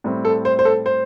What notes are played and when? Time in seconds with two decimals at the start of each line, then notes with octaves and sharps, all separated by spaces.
0.04 A2 G3 C4
0.25 A4
0.45 C5
0.59 C5
0.65 A4
0.86 C5